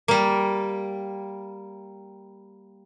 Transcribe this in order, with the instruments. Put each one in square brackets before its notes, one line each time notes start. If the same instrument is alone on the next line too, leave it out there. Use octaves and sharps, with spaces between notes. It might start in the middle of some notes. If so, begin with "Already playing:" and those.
[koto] G3 A#3